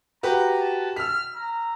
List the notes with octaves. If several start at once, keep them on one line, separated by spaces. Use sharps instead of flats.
F#4 G4 B4 A#5
A5
E6 F6 B6
A#5